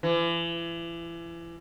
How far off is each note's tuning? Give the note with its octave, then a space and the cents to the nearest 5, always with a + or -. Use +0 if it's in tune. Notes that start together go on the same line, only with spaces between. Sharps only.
E3 +35